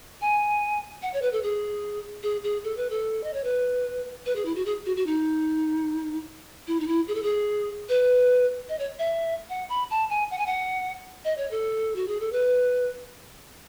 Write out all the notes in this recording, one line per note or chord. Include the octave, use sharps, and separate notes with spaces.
G#5
F#5
C#5
B4
A4
G#4
G#4
G#4
A4
B4
A4
D#5
C#5
B4
B4
G#4
E4
F#4
G#4
F#4
F#4
D#4
E4
D#4
E4
G#4
A4
G#4
B4
D#5
C#5
E5
F#5
B5
A5
G#5
F#5
G#5
F#5
D#5
C#5
A4
F#4
G#4
A4
B4